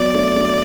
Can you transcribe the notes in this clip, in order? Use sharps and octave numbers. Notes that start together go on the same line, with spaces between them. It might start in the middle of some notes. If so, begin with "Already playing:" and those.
Already playing: F#3 B3 D5
A3 D4
A3 D4